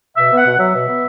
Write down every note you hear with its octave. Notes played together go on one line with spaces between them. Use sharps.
B2 E5
B3
F#5
B2
F#3 E5
B2
B3